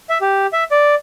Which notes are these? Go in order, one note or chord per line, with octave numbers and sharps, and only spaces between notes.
E5
G4
E5
D5